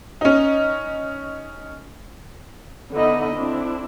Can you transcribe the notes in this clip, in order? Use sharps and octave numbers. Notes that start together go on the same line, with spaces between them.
C#4 D#4
D3 B3 D#4 E4 D#5 B5
C4 D4 E4